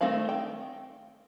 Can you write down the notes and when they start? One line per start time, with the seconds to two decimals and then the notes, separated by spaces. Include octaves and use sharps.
0.01 D#3 A3 C4 F5 B5
0.29 G5